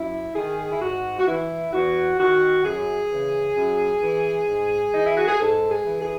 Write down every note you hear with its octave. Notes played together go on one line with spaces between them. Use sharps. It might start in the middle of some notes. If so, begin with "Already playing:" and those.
Already playing: F#2 E4
D#3 G#4
E4
G#2 F#4
F#4
E3 E4
E2 F#4
D#3 F#4
F#2 G#4
C#3 E3
F#2
E3
G#2
E3 D#4
E4
F#4
G#4
G#2 A4
G#4
E3
G#4